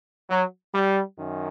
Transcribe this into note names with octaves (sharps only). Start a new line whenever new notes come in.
F#3
G3
F#2 D#3